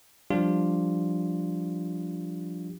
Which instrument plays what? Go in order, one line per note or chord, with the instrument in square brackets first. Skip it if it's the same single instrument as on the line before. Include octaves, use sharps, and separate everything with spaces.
[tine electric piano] F3 G3 D4 F4 G4